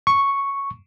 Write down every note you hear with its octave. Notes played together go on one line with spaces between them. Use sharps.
C#6